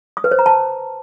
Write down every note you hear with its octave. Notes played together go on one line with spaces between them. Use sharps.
D#6
B4
C5
A#5
A5